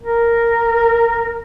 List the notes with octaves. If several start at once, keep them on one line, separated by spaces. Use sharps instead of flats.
A#4